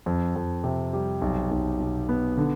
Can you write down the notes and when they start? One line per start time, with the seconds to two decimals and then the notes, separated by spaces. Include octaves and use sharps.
0.06 F2
0.36 F2
0.64 C3
0.93 G3
1.22 B1
1.51 B1
1.80 B2
2.09 B3
2.37 D3